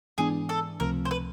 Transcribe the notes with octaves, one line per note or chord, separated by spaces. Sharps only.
G#2 E3 G#3 B3 D4 G#4
A4
C#2 C3 F3 A3 C4 A#4
C5
B4